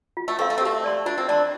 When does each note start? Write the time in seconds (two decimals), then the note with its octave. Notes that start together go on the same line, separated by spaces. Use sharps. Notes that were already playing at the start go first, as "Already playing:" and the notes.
0.17 F4
0.28 A3
0.39 C4 A4 F5
0.50 A3
0.58 C4
0.61 A3 G4
0.84 D5 A5 C6
1.06 D4 F4
1.18 C4
1.28 D4 D5 A5 C6